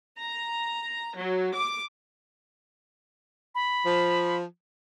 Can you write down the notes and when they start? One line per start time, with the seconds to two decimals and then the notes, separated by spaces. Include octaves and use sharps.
0.19 A#5
1.15 F#3
1.54 D6
3.55 B5
3.85 F3